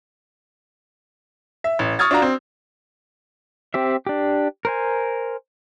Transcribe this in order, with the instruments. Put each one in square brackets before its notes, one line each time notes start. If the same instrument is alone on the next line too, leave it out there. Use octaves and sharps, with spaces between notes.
[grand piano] E5
A1
C#6 D#6 F6 G#6 A6
D4 F4 F#4 A#5
C4
[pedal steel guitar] C4 G4 E5
D4 G4
A#4 C5 G#5